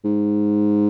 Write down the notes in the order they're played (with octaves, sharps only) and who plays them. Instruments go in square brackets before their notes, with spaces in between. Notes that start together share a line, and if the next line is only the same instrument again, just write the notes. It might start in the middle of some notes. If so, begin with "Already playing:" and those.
[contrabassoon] G#2